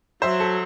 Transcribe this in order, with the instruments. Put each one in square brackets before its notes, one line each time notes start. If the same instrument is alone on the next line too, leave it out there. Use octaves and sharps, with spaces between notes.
[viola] F#3 [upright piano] C5 E5
[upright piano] A4